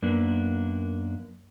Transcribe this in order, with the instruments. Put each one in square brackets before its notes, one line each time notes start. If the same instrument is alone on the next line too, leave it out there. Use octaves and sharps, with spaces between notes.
[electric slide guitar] F#2 A#3 B3 D4